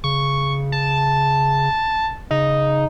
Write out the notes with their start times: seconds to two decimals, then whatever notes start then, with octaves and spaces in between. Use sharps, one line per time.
0.04 C#3 C#6
0.72 A5
2.31 C#3 D#4